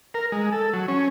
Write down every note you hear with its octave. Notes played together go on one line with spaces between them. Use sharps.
A#4
G#3
A4
F#3
C#4